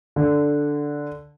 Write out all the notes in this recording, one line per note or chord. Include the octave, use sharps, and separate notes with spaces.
D3